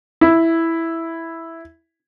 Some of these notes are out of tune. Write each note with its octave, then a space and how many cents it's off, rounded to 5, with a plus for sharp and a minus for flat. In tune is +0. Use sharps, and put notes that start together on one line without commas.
E4 +0